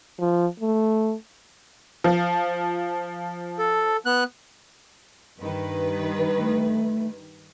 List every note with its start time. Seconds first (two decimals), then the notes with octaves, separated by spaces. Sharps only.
0.19 F3
0.60 A3
2.04 F3
3.58 A4
4.06 B3 F#6
5.40 G2 D#3 B4
6.37 A3